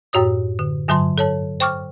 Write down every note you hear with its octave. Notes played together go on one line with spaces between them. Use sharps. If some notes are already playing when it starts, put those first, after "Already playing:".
F#2 A2 F#4 C#5 D#6
D3
G2 D3 F#3 A5 C6
A4 C#5 A5
C5 G5 C#6 D6 F6